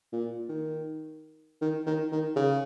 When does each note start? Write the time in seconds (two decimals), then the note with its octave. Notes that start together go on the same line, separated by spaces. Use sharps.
0.13 A#2
0.49 D#3
1.61 D#3
1.86 D#3
2.12 D#3
2.36 C#3